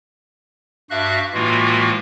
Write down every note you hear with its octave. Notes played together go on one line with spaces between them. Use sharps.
G2 F#4 E5 F5 F#6
A2 E3 G#3 A#3 F4 F#4